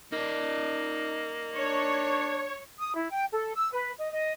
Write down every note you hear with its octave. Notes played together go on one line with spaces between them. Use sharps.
A#3 D#4 D5
D4 C#5
D#6
E4
G5
A4
E6
B4
D#5
D#5